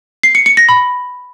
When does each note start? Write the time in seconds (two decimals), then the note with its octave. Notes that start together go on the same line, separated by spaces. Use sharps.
0.23 C7
0.35 C#7
0.46 C#7
0.57 A#6
0.69 B5